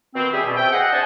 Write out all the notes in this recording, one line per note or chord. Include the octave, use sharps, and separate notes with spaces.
B2 D#3 C4
G3 C#4 G4 G#4 E5
B2
C4 E5 G5
G#4 D#5 F#5
D4 C5 G#5 A5